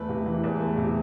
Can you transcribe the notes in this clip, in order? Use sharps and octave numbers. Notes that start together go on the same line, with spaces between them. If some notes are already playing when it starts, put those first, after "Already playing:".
Already playing: E2 A3 B4
C3
E3
E2
A3
C3